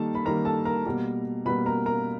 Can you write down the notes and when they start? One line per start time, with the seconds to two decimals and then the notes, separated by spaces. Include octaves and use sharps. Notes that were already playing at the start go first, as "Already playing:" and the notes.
Already playing: D#3 G3 A#3 A4 A5
0.15 B5
0.25 D#3 G3 A#3 A#4 A#5
0.45 A4 A5
0.65 A#4 A#5
0.86 B2 G3 A#3
1.45 B2 G3 A#3 B4 B5
1.66 A#4 A#5
1.86 A#4 A#5